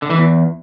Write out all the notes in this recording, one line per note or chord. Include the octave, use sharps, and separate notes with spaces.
D3
E3
E2